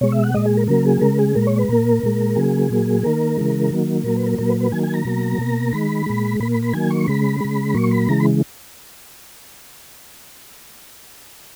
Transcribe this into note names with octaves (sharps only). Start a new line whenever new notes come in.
B2 G#3 C#5
E5
F#5
A#2 G#3 D#5
G#4
A#4
C#3 F#3 A#3 A#4
G#4
C#3 G#3 A#4
G#4
A#2 G#3 A#4
C#5
B4
A#2 A#3 A#4
A#2 G#3
C#3 F#3 A#3 G#4
A#2 F#3 A#3
D#3 A#3 A#4
C#3 E3 G#3
D#3 F#3 A#3
A#2 F#3 A#3 A#4
B4
A#4
A#2 F#3 A#3 A#4
B4
B4
D#3 F#3 A#3 G#5
G#5
A#5
B2 F#3 A#3
B2 A#3
D#3 G#3 B5
A#2 G#3
A#2 A#3 B5
B5
B5
D#3 F#3 A#3 G#5
C#6
C#3 G#3 B5
C#3 G#3
A#2 F#3 A#3 C#6
B5
C#3 E3 G#3 A#5
B5